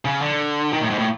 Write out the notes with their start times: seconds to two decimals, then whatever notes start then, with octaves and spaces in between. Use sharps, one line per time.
0.05 C#3
0.22 D3
0.73 D#3
0.81 A2
0.90 G#2
0.99 A2